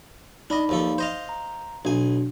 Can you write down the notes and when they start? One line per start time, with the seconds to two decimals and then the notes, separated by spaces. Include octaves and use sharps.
0.50 D4 D#4 D5 D#5 B5
0.69 D#2 F3 A4
0.98 C5 D#5 F5
1.29 A#5
1.85 B1 D4 F#4 G#5